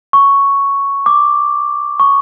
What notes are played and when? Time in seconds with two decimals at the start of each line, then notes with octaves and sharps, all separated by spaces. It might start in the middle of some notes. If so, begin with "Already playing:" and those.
0.13 C#6
1.06 D6
2.00 C#6